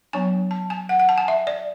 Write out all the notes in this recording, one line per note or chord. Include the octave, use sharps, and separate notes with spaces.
F#3 B3 D4 G#5
A5
G#5
F#5
F#5
A5
G#5
E5
D5